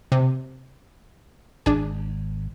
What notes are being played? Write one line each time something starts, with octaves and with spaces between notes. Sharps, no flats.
C3
G#1 D4 G#4